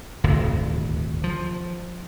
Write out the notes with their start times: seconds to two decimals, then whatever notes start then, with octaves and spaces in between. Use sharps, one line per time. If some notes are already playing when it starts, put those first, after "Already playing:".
0.24 D#1 G#1 D2 C3
1.24 F3